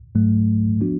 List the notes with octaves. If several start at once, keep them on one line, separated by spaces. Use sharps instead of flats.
G#2 F#3 A3
F3 B3 D4 F#4